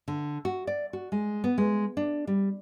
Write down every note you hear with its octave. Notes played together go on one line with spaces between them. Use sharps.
D3
F#4
D5
F#4
G#3
B3
G#3
D4
G3